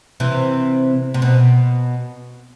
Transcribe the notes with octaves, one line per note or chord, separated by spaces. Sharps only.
C3 E3
C3
B2